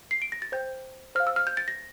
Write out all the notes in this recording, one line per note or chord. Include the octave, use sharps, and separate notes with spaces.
C7
D7
A#6
A6
C5 G5 G6
C5 F5 F6
E6
F6
G6
A6
A#6